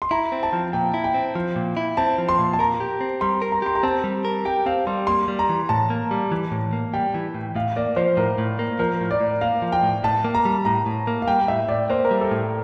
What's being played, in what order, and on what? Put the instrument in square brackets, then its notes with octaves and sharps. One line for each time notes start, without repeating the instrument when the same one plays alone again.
[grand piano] C6
[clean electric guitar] E4 [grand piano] A#5
[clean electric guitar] C4
[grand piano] A5
[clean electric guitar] F3
[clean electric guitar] A#2 [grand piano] G5
[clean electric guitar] E4
[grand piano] G5
[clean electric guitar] C4
F3
A#2
E4
[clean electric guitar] C4 [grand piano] A5
[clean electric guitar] F3
[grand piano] C6
[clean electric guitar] A#2
[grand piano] A5
[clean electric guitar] A#4 [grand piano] A#5
[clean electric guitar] G4
C4
[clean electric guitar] G3 [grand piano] C6
[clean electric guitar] A#4
[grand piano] A#5
[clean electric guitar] G4 [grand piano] C6
[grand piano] A#5
[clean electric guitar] C4 [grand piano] A5
[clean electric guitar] G3
A#4
[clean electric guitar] G4 [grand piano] G5
[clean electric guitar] C4 [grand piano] F5
[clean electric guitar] G3 [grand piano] C6
[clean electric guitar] A#3 [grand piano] C6
[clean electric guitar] G3
[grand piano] A#5
[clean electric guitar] E3
[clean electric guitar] A2 [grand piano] A5
[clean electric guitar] A#3
G3
E3
A2
A#3
[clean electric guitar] G3 [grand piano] G5
[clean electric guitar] E3
A2
[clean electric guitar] A2 [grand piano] F5
[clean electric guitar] A#3 [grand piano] D5
[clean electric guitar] F3 [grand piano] C5
[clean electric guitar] A2 [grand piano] A#4
[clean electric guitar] A2
A#3
[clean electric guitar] F3 [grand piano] A#4
[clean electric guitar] A2
[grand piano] D5
[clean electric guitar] A2
[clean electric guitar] A#3 [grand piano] F5
[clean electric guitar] F3
[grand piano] G5
[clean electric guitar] A2
[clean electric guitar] A2 [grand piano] A5
[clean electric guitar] A#3
[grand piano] A#5
[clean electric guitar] G3
[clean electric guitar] A2 [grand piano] A#5
[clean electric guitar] A2
A#3
[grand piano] F5
[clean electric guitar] G3 [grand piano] G5
[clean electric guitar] A2 [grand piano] E5
[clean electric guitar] A2 [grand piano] D5
[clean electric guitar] A#3 [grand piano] C5
[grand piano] A#4
[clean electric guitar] G3
[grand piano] A4
[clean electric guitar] A2